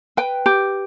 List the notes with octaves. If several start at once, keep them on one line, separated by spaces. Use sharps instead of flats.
B4 G5
G4